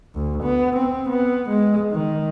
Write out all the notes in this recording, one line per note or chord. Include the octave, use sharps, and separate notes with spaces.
D2
B3
C4
B3
G#3
D#3